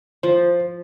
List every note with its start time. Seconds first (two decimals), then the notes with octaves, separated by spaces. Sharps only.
0.23 F3 C5